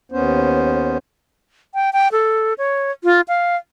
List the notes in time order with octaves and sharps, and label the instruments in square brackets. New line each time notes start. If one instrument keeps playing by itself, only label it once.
[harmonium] D#2 B3 C#4 C5
[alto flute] G5
G5
A4
C#5
F4
F5